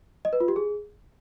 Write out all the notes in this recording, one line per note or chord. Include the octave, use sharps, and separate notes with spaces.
D#5
B4
F4
G4
G#4